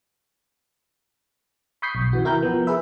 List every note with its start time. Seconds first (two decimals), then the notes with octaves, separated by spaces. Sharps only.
1.82 B5 C#6 D#6 G6 B6 C7
1.95 B1
2.13 C3 E3 F#4
2.25 E4 A#4 G5 A#5 G6
2.43 F3 B3
2.67 G#4 B4 E5